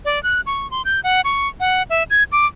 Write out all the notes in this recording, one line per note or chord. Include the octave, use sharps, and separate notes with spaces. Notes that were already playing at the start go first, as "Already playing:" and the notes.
D5
F#6
C#6
C6
G6
F#5
C#6
F#5
E5
G#6
D6